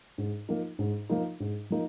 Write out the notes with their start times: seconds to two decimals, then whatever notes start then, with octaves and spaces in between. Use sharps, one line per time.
0.18 G#2
0.49 F3 A#3 D#4
0.79 G#2
1.09 F3 A#3 D#4
1.40 G#2
1.70 F3 A#3 D#4